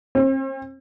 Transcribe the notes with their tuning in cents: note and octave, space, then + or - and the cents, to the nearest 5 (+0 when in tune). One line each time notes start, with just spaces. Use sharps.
C4 +45